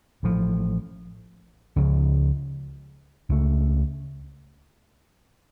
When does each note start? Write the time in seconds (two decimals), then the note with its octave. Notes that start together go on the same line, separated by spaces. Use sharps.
0.23 A1 A2 F3
1.76 C#2 C#3 F3
3.29 C#2 C#3 A3